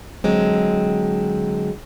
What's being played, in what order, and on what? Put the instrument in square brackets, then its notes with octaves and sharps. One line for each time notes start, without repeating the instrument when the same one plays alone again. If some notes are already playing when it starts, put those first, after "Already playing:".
[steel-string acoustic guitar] D3 F#3 G#3 C4